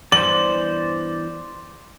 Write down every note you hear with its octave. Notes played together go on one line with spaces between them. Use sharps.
E2 G2 E3 C5 D5 F#7